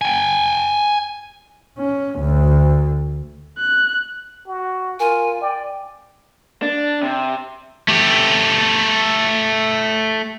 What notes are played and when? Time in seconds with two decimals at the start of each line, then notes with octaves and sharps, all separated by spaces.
0.02 G5 G#5
1.78 C#4
2.20 D2
3.58 F#6
4.47 F#4
5.00 F4 A#4 G#5
5.41 D5 G5
6.62 D4
7.03 C3
7.88 A3 G4